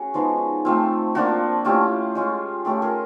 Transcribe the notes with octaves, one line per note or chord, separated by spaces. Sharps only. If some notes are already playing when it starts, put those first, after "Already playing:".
Already playing: C#4 F#4 G#4
F3 G#3 B3 D#4
F3 A3 C4 F4
F3 A#3 D4 F4 F#4
A3 C#4 E4 F4 G4
G#3 C#4 F4
A3 C#4 F4 G4 A4
G#4 A#4